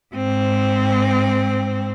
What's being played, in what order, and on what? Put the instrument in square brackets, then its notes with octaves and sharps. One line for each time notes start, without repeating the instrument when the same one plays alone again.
[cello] G#2 C4